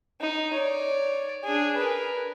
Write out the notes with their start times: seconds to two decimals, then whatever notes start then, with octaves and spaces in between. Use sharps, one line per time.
0.21 D#4
0.54 C#5 D5
1.44 D4 G#4
1.77 A#4 B4